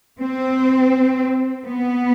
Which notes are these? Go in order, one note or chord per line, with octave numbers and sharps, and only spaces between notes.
C4
B3